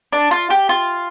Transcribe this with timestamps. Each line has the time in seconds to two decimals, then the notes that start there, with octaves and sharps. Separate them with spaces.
0.13 D4
0.31 F4
0.50 G4
0.69 F4